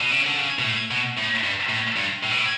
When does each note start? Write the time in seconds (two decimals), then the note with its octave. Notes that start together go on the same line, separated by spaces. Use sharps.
0.01 B2
0.11 C#3
0.26 D3
0.38 C#3
0.59 B2
0.64 A2
0.91 B2
1.17 A2
1.44 G2
1.70 A2
1.97 G2
2.24 A2
2.31 B2
2.39 A2